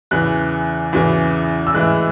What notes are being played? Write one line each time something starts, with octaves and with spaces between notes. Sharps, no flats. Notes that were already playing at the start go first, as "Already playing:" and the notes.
E2 C#3 E3 F#6
E2 C#3 E3
E6
A2 E3 G#3 F#6